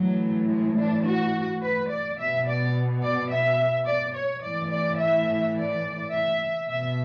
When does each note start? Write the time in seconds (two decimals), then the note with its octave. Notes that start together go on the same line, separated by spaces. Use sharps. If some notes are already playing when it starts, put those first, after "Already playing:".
Already playing: A2 E3 F#3
0.50 G#3
0.78 D4
1.06 F#4
1.62 B4
1.90 D5
2.18 B2 E5
2.47 D5
3.02 D5
3.30 E5
3.87 D5
4.15 C#5
4.43 A2 E3 D5
4.71 D5
4.99 E5
5.55 D5
6.11 E5
6.68 B2 E5